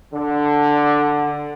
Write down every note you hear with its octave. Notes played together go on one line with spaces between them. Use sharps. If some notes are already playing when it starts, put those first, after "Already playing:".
D3